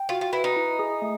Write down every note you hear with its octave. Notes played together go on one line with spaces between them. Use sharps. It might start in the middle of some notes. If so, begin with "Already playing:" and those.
Already playing: G5
F4 F#4
F4
E4 B4
D#4
E4
G#4
A3